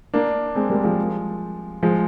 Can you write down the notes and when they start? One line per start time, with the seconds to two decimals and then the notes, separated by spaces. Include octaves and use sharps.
0.14 A#3 D4
0.55 G#3 C4
0.70 G3 A#3
0.84 F3 G#3
1.83 F3 G#3